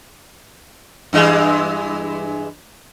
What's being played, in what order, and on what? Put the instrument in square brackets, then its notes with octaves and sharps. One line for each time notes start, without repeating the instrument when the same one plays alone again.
[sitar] G2 E3 G#3